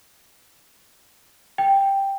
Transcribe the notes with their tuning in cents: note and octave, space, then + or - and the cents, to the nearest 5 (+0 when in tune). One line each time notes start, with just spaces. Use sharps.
G5 +5